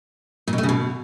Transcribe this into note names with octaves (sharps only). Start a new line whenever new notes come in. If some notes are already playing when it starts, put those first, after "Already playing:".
A#2
B2
A3
C#3
B2